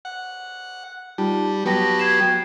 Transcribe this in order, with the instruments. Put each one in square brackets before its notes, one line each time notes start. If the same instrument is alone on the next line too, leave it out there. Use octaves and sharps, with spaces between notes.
[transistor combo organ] F#5
[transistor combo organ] G3 [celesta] D#4 F4 A5
[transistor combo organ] F#3 B3 G4 [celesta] A5 A#6
[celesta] G#6 C7 E7